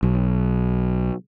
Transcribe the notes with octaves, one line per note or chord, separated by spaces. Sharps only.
B1